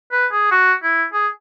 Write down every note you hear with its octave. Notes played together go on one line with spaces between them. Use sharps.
B4
G#4
F#4
E4
G#4